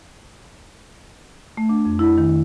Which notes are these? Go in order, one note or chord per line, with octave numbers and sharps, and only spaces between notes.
A3
D4
F2
E4
D#3